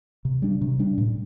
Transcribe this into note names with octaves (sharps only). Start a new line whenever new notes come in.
C3
G3 D4
C3
G3 D4
A2